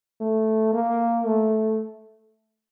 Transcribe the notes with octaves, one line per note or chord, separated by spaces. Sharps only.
A3
A#3
A3